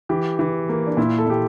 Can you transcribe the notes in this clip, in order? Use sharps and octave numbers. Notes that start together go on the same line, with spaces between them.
E3 G4
E3
A#3
D4
A#2 E4
A4
A#2 G4